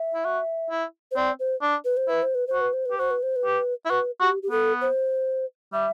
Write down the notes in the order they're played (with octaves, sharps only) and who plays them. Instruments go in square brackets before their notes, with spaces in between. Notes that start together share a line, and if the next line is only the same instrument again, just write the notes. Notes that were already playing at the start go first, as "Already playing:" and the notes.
Already playing: [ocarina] E5
[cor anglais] E4
F#4
E4
[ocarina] C5
[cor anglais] C4 [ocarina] D5
[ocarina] C5
[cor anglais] D4
[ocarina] B4
C5
[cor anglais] E4 [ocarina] B4
[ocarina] C5
B4
C5
[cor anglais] F#4
[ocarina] B4
C5
B4
[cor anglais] G4
[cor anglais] F#4 [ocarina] C5
[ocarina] B4
C5
B4
[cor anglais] G4
E4
[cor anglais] F#4 [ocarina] B4
[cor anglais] F#4 [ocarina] G4
[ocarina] G4
[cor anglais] B3 [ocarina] A4
[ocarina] C5
[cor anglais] G3 [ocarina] E5